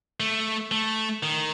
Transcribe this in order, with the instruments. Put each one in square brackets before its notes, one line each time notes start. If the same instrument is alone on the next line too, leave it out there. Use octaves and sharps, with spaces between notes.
[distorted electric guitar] A3
A3
D#3